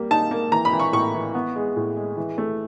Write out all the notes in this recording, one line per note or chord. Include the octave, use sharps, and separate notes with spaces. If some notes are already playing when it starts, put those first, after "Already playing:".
Already playing: G3 A#3
D#4 A5
A#3
E3 A#5
B5
E3
C#6
A2 C#6
E3
B3
G#3
A2
G#3
E3
A3